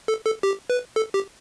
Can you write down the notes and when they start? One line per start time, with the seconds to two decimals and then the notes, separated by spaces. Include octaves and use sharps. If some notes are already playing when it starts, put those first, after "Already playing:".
0.08 A4
0.25 A4
0.43 G4
0.70 B4
0.96 A4
1.14 G4